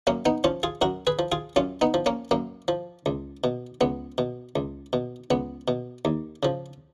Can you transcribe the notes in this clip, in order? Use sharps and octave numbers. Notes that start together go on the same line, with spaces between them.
F#2 A#3 C#4
B3 D#4
F3 C#4 F4
F4 G#4
F#2 F#4 A#4
G#4 B4
F3
F4 G#4
F#2 C#4 F4
B3 D#4
F3
A#3 C#4
F#2 A#3
F3
C#2
B2
C#2 B3
B2
C#2
B2
C#2 B3
B2
D#2
C#3 F3